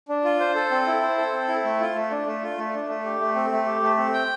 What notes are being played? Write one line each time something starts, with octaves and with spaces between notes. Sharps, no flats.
D4
F4
C5
A4
C4
E4
C5
A4
C4
E4
A3
F4
A3
D4
A3
F4
A3
D4
A3
G4
A3
C4
A3
G4
A3
C4
G5